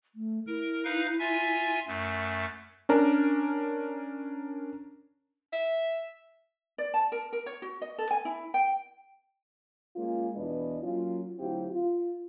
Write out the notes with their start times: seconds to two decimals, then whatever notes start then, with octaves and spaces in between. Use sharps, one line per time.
0.15 A3
0.47 E4 A#4
0.85 D#4 B4 F5
1.19 F4 E5 G#5
1.87 F#2 A3
2.89 C#4 D4 A#4
5.52 E5
6.78 D5
6.94 A5
7.12 A#4
7.33 A#4
7.46 C#5
7.62 F#4
7.81 D#5
7.98 A4
8.11 G#5
8.25 E4
8.54 G5
9.96 G#3 A#3 C#4 F4
10.36 E2 B2 D4 E4 B4 D#5
10.83 F#3 A#3 C#4 F4
11.39 D2 F#3 C4 E4 F4 G4
11.72 F4